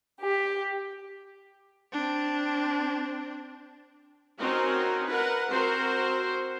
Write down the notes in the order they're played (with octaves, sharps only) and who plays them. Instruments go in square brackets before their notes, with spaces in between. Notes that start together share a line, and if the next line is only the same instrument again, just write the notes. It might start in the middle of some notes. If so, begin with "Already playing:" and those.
[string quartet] G4
[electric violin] C4 D4
[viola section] C4 C#4 D#4 F#4 A#4
A#4 B4 F#5
C4 F#4 A#4 C5